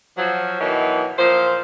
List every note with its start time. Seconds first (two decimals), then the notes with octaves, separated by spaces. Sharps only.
0.17 F3 F#3
0.61 B2 D#3 E3 F#3
1.18 A#2 F3 C5